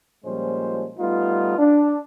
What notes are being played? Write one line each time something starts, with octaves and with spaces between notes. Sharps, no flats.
A#2 F3 G3 G#3 C#4 C5
G3 A3 B3 D#4 F4
D4